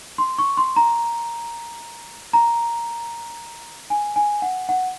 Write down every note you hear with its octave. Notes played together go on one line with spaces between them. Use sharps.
C6
C#6
C6
A#5
A#5
G#5
G#5
F#5
F#5